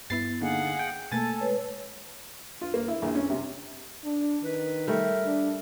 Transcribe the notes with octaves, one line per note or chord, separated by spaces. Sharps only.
G2 B3 E4 A6 C7
D3 A#3 D#4 G#4 F5 F#5
G5
B2 A3 A#3 A4 G#5 A6
G#3 B4 C#5
F4
A#3
E4
A#1
C#4
C3
D4
D#3 B4
G3 A3 A#4
D4